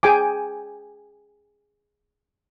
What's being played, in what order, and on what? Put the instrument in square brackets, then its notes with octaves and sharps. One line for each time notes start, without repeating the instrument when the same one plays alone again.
[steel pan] G#4 G5 G#5 D6